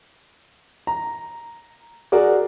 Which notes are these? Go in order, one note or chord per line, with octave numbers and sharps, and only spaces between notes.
A#5
F#4 G#4 A#4 D5